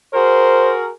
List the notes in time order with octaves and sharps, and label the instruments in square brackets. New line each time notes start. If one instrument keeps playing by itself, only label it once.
[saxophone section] F#4 G#4 A#4 [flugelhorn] C5